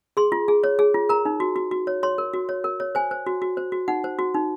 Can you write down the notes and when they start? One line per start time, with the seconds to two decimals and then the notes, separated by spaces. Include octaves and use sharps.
0.17 G#4 C6
0.32 F4
0.48 G#4
0.64 C#5
0.79 G#4
0.94 F4
1.09 A#4 A#5
1.25 D#4
1.40 F#4
1.56 F#4
1.71 F#4
1.87 C#5
2.03 C#5 C6
2.18 A#4
2.34 F#4
2.49 C#5
2.64 A#4
2.80 C#5
2.95 C5 G#5
3.11 C5
3.27 F#4
3.42 F#4
3.57 C5
3.72 F#4
3.88 D#4 F#5
4.04 C5
4.19 F#4
4.34 D#4